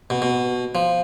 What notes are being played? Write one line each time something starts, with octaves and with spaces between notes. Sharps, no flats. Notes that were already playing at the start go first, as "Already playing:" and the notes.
B2
B2
F3